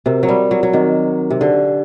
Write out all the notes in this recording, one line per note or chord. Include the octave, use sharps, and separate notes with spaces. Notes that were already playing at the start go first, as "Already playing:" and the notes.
C3 C4 F#4 A#4
F#3
G3
F#3
F#3
D#3 C4 F#4 A#4
C3
D3 D4 G4 D5